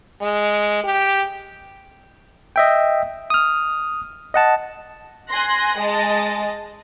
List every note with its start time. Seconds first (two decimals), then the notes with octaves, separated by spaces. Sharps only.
0.21 G#3
0.84 G4
2.56 D#5 E5 G5
3.30 D#6 F6
4.34 D#5 F#5 A5
5.30 G#5 C6 F#6 A#6
5.79 G#3 D#5 A5